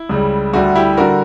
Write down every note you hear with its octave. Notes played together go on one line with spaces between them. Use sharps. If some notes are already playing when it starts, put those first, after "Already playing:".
Already playing: E4
C#2 C#3 G3
D2 D3 G3 F#4
E4 G4
D3 G3 F#4 A#4